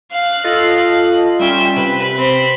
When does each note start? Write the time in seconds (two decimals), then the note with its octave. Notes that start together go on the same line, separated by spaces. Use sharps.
0.11 F5 F#6
0.44 F4 A4 D#5
1.40 G3 C#4 F4 E5 G5
1.76 C3 B4
2.16 C4 B5